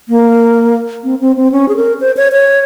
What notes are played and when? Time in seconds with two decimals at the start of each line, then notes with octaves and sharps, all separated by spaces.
0.09 A#3
1.04 C4
1.21 C4
1.37 C4
1.52 C#4
1.68 G#4
1.76 A#4
2.00 C5
2.17 C#5
2.33 C#5